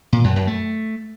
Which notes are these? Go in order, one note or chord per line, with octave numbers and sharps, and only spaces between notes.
A#2
F#2
F#2
A3